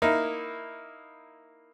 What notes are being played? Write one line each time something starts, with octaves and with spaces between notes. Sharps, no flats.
A#3 D#4 E4